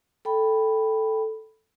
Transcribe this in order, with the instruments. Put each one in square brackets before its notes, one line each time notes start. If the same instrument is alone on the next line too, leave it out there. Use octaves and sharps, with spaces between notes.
[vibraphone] A4 G5 B5